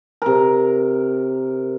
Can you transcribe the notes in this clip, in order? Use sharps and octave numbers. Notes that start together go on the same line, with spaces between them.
C3 A#4